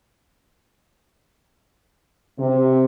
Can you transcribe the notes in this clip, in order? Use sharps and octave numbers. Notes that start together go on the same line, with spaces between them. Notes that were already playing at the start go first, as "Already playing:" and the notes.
C3